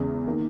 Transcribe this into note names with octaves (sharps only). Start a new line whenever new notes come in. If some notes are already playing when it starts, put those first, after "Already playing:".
Already playing: E2 C#3 G#3
D#3 A#3